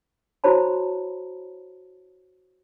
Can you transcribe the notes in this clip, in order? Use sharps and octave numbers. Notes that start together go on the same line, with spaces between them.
E4 F#4 C5 C#5 A5 B5